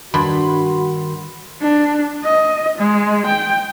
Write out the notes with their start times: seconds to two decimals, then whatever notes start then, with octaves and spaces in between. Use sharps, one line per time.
0.14 G2 D#3 F#4 B5 C6
1.62 D4
2.24 D#5
2.78 G#3
3.26 G5